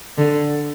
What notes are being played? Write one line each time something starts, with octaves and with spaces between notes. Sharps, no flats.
D3